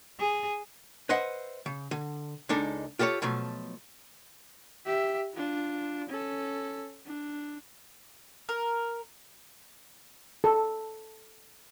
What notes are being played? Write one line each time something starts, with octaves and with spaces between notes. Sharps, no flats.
G#4
B4 C5 D#5 E5 F#5
C#3
D3
C#2 G#3 D4 D#4 A4
F4 G4 A4 A#4 C#5
B2 F3 F#3 A3
G4 E5
D4 F4
C#4 A4
D4
A#4
A4